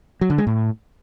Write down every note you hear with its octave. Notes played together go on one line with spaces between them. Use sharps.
F#3
D3
G#3
A2